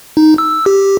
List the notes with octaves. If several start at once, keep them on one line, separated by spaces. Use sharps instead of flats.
D#4
E6
G4